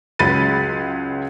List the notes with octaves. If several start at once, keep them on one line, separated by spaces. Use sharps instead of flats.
C#2 F#3 G#3 B5 A6 D#7